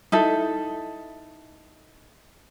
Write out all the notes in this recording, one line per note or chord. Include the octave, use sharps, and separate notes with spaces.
D#4 E4 A4